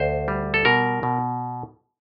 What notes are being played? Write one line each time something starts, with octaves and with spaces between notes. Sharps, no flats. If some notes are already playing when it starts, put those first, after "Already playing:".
Already playing: D2 C5
G3
A4
B2 A#4
B2